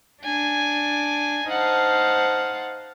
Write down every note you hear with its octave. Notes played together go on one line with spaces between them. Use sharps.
D4 G#5
D#4 C5 F5 F#5 A5